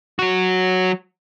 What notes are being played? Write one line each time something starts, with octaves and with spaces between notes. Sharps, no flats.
F#3 F#4